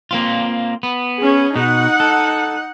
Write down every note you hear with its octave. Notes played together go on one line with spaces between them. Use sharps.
A#3 C4 F4
B3
C#4 G#4
B2 D#4 F#5
A4